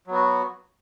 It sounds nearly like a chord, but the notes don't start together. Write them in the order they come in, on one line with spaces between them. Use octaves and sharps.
F#3 B3 F#4